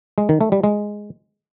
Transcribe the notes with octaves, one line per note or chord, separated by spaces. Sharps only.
G#3
D#3
A3
G3
G#3